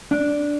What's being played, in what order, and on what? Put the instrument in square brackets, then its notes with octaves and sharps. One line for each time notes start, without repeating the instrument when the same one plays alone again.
[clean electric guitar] D4